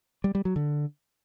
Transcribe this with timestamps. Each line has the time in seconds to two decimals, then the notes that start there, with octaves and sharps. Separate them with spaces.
0.24 G3
0.35 G3
0.45 F#3
0.56 D3